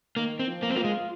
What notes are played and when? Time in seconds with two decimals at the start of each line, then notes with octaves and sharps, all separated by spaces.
0.16 D#3 A#3
0.39 C4
0.47 F3
0.63 A#3
0.70 C4
0.76 A#3 F4
0.84 G#3